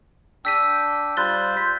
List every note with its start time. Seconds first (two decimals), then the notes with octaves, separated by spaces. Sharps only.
0.45 D4 G5 E6 B6 D#7
1.17 G3 F4 C5 F#6 A6 G7
1.57 G6 B6